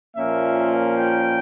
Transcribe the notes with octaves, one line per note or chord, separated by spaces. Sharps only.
A#2 F3 A#3 C#4 E5
G5